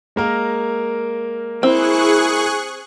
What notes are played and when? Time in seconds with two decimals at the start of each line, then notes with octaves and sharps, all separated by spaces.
0.16 G#3 A#3 A#4
1.63 C4 E4 G#4 C#6 F#6